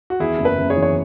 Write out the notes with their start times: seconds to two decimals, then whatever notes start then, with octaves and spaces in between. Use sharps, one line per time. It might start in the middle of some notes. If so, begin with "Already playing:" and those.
0.10 F#4
0.20 E2 E4 G#4
0.38 F#1
0.45 B4 E5
0.57 F#1
0.70 G#4 C#5
0.76 E3
0.82 C#5